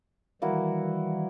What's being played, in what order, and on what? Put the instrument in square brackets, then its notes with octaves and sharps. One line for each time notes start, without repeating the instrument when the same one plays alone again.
[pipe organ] D#3 E3 G3 [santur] A#3 E4 F#4